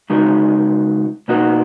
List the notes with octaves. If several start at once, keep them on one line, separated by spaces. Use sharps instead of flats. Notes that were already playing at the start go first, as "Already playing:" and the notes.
C#3 G#3 D#4 F#4 A#4
B2 A#3 D#4 F#4 A#4